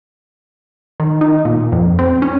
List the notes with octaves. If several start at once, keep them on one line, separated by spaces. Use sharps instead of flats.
D#3
D#4
A#2
F2
C4
C#4